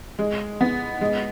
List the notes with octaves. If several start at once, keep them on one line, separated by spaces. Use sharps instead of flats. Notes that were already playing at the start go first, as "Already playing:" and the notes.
G#3
B3
G#3